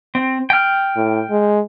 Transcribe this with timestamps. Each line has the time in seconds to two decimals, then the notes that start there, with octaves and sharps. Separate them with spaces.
0.15 C4
0.50 G5 F6
0.96 A2
1.31 G#3